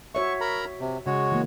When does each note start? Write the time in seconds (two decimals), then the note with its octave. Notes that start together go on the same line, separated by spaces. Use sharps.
0.15 F#4 C#5 E5 C#6
0.41 A#4 A#5 B5
0.80 C3
1.06 C#3 G#3 F#4 C#5
1.32 E3 A#3